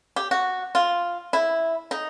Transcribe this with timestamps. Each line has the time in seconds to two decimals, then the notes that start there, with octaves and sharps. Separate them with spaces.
0.16 G4
0.31 F#4
0.75 F4
1.33 E4
1.91 D#4